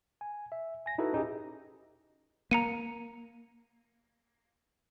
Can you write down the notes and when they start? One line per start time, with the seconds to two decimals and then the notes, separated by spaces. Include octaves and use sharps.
0.21 G#5
0.52 E5
0.86 G#5 A#6
0.98 D#4 E4 F#4 A4 B4 D#5
1.13 C#4 D#4 G4 G#4
2.51 A#3 A#5 C#7 D#7